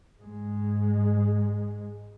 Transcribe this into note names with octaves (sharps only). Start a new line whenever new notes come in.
G#2 G#3